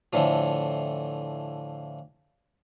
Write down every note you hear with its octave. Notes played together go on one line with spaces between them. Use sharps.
A2 D3 E3 F3